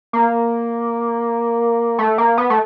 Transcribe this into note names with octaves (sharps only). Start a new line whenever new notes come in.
A#3
A3
A#3
B3
A3